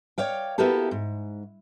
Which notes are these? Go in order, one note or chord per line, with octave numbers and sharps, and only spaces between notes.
C#5 D5 F5 G5
A#3 B3 E4 F#4 G4 A4
G#2